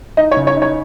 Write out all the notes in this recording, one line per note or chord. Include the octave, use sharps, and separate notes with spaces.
D#4 D#5
C#5
C#3
C#5
D#4
C#5